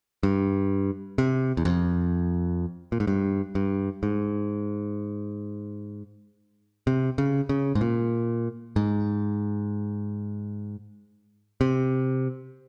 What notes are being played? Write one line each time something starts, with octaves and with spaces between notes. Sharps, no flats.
G2
C3
E2
F2
A#2
G#2
G2
G2
G#2
C3
C#3
C#3
G#2
A#2
G#2
C3